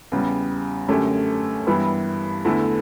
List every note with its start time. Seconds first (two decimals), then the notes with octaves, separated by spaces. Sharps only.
0.12 E2 C#3 G3
0.88 F#2 D3 A3 C#4 G4
1.67 G2 E3 G3 B3 E4
2.45 E2 D3 A3 E4